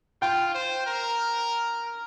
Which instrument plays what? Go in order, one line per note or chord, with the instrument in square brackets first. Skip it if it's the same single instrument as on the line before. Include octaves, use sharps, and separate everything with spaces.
[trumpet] F4 [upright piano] G5
[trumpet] C5
A#4